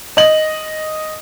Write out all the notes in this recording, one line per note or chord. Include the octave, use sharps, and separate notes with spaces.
D#5 F#7